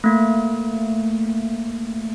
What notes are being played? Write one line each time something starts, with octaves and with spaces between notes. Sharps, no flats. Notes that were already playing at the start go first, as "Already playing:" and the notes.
A3 A#3